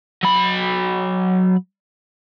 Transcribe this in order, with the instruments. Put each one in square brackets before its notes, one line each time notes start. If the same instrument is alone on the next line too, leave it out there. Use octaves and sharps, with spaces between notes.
[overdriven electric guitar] F#3 B5